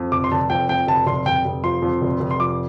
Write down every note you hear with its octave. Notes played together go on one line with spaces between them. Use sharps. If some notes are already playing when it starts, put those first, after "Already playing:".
Already playing: F2
F1 D6
C6
F1 A5
F2 G5
F2 G5
F1 A5
F1 C6
F1 G5
F1
F3 C6
F2
F1
F1
C6
F3 D6